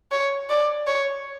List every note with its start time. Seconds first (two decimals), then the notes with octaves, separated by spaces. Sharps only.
0.12 C#5
0.50 D5
0.87 C#5